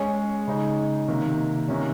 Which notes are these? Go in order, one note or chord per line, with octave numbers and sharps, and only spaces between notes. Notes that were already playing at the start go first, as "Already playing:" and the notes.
Already playing: G#3 C#4 G#4
C#3 G#3 D#4
C3 D#3 A#3
C3 D#3 A#3 C#4